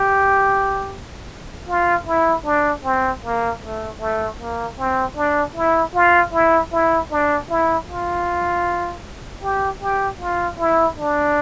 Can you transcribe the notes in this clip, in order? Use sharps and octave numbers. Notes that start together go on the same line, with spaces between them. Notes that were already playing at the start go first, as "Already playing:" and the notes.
Already playing: G4
F4
E4
D4
C4
A#3
A3
A3
A#3
C4
D4
E4
F4
E4
E4
D4
E4
F4
G4
G4
F4
E4
D4